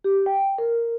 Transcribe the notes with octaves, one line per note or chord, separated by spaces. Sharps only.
G4
G5
A#4